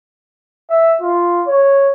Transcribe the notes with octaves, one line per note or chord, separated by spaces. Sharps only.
E5
F4
C#5